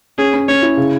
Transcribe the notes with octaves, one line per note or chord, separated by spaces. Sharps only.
C#4 G#4
C#4
C#4 C#5
E4
C#3